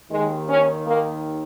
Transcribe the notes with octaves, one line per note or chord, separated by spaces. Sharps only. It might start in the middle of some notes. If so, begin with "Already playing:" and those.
D#2 D#3 G#3
C#4
A#3